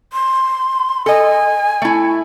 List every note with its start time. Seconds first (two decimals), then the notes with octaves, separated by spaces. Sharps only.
0.13 C6
1.06 A4 D#5 G#5
1.82 A3 E4